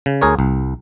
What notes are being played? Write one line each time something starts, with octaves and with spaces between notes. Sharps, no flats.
C#3
D2 G#4 A#4 C#5
C2